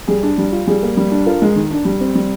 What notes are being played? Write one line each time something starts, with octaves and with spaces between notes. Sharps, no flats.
G3 G#4
D4
G3
F4
G3 G#4
A#3
G3
D4
F4 A#4
G#3
D#3
D4
G3
C4
G3